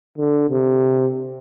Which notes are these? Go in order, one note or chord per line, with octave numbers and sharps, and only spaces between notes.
D3
C3